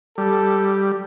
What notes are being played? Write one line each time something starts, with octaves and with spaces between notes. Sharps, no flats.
G3 A4